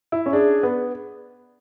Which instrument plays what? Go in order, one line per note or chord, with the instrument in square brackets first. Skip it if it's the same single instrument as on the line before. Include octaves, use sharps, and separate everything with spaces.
[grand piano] E4
C#4
[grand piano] D4 [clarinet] G#4
[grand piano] B3